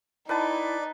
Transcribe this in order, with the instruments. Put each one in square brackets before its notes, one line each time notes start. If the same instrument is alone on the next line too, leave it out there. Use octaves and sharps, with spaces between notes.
[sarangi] D#4 [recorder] E4 [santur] B4 G5 A5 [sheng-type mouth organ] D5